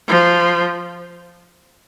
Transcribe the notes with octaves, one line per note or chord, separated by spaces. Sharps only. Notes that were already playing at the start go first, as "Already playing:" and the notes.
F3